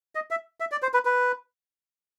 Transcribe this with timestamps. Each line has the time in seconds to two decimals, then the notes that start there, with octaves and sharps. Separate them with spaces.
0.15 D#5
0.31 E5
0.60 E5
0.72 D5
0.82 C5
0.94 B4
1.05 B4